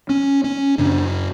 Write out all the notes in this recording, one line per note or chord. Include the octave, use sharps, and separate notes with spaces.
C#4
C#4
F#2 C#3 D4